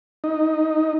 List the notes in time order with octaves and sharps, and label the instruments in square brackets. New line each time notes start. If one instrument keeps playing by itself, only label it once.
[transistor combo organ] D#4